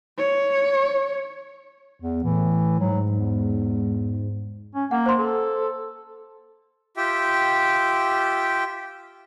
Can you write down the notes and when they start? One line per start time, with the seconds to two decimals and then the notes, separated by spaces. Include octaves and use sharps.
0.18 C#5
2.00 E2
2.23 A2 E3
2.80 G#2 F#3
3.11 E2
4.75 C#4
4.91 A#3 F#5
5.06 C5 C6
5.19 A4
6.97 F4 G4 E5 G5